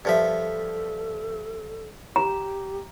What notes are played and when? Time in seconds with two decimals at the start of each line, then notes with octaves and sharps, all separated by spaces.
0.05 G2 F3 A4 E5
2.16 G4 A#5